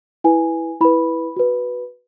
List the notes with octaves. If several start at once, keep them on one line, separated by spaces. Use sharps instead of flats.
E4 B4 G#5
E4 B4 B5
F#4 B4